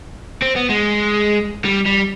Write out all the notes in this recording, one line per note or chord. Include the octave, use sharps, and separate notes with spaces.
C4
B3
G#3
G3
G3